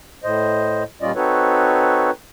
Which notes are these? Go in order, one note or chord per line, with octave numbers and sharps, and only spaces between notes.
A2 C5 D#5
A#2 G3 C#4 F4 D5 D#5
C4 D#4 F#4 A4 B4 C#5